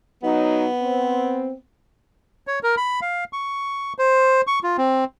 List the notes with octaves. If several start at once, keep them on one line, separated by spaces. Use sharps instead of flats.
F#3 B3 D#4
C4
C#5
A#4
B5
F5
C#6
C5
C#6
F4
C4